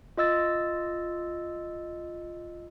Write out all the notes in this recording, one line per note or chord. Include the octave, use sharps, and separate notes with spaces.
F4 D#5 E6 A6